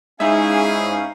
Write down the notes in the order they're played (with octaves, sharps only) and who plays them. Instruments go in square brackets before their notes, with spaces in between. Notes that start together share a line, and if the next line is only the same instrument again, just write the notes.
[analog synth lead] G#2 [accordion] C#4 F5 [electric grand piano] D#4 E5 [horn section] E4 G#4